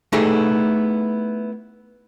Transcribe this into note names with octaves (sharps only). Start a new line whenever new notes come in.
A3 B3 D#4 E4 G4 G#4